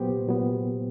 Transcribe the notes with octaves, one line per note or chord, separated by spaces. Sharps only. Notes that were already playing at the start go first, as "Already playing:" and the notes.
Already playing: A#2 F#3 B3 G4 C5
C2
A#2 F#3 B3